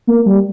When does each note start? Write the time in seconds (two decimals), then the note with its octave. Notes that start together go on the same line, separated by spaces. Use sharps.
0.07 A#3
0.26 G3